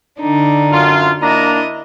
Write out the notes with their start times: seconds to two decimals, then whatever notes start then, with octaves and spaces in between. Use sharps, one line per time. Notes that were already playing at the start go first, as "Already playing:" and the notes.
0.19 D3 D4 D#4
0.72 F#2 F4
1.22 A#3 D4 E4 D#5 A#5